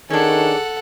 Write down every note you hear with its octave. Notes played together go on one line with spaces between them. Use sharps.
D#3 C#4 D4 G#4 A4 F#5